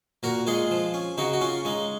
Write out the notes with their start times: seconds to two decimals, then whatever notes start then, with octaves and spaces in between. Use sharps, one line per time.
0.23 A#2 F#4 A#4
0.47 G#3 F4 G#4
0.71 F3
0.94 C#4
1.18 C#3 D#4 F#4
1.33 F#4
1.41 C#4 F4
1.65 G#3 D#4